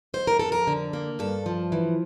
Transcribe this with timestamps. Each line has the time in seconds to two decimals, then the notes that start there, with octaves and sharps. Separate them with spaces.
0.14 F2 C5
0.27 A#4
0.39 F2 A4
0.52 A#4
0.67 D3
0.93 A#3
1.19 G2 A4
1.46 F3
1.72 E3